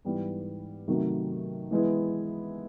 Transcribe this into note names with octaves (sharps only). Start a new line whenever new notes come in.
G#2 E3 G3 B3
C3 D#3 F#3 A3
E3 G#3 B3 E4